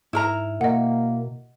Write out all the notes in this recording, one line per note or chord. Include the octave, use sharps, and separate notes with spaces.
G#2 E4 A#4 A#5
B2 A#3 D#5 F#5